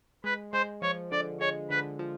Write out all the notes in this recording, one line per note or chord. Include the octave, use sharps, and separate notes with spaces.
G#3 B4
G#3 C5
F3 C#5
D3 D5
G#3 C#5
D3 B4
F3